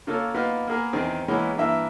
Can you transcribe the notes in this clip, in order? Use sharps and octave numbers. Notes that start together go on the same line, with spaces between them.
C#3 A#3 F4 A4 C#5
A#3 B3 D#4 F4 B4
A#3 B3 G#4 A#4
E2 D#3 C4 G#4
C#3 E3 G#3 A#3 B3 C#4
G2 E3 A#3 E5